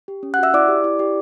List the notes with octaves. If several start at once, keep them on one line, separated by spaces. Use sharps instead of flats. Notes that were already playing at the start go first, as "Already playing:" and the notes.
G4
C#4
F#5 F#6
F#4 E5 E6
E4 D5 D6
G4
E4
G4